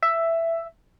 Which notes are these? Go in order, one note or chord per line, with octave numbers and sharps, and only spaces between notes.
E5